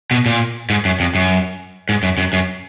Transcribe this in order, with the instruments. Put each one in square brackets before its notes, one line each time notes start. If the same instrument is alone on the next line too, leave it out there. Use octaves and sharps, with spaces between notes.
[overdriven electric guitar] B2
A#2
G#2
F#2
F2
F#2
G#2
F#2
F#2
F#2